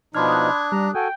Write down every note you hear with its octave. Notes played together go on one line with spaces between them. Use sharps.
B2 F3 D4 D#4 B5 C6 F6 G#6
D#6 F#6
G3 A#5
F#4 A4 G5 G#5